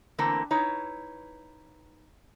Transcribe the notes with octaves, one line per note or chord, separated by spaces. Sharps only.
D3 E3 A3 A#3 C4
D#4 E4 B4 C#5